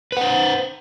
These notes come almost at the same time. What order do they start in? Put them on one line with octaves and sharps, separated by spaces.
B4 F#5 C5